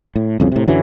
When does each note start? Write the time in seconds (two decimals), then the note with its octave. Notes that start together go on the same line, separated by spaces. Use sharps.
0.16 A2
0.40 C2 F2 C#3
0.52 A2 C3
0.68 F#2 D3 E3 F#3